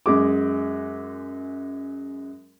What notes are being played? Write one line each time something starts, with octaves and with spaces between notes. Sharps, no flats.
F#2 G#3 D6